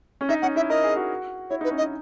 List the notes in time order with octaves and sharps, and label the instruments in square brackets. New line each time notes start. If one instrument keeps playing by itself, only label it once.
[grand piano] C#4
[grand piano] D#4 [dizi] E5
[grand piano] C#4 [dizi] F#5
[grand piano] E4 [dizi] E5
[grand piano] A#4 [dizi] D#5
[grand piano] G#4
F#4
[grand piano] E4 [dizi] C#5
[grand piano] D#4
[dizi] B4
[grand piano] C#4
[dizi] D#5
[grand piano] D#4